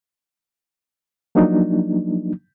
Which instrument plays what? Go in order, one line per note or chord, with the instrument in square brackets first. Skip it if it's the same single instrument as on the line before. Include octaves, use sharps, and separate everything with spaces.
[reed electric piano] F3 F#3 A#3 D4 D#4